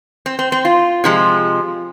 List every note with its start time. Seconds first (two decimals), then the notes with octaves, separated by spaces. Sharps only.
0.26 C4
0.39 C4
0.52 C4
0.65 F4
1.04 C3 F3 G#3